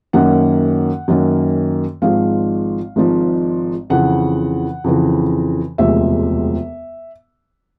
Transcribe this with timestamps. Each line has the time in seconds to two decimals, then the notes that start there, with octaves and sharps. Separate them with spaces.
0.13 F#2 D#3 F#3 A#3 C#4 F#5
1.08 F#2 D#3 F#3 A#3 C#4
2.02 G#1 G#2 F3 G#3 F5
2.96 G#1 G#2 F3 G#3
3.90 F2 C#3 E3 F#5
4.84 F2 C#3 E3
5.78 E1 D2 C3 F3 G#3 E5